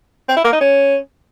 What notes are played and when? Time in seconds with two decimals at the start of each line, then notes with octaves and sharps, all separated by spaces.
0.28 C4
0.36 E4
0.45 A#3
0.53 D#4
0.61 C#4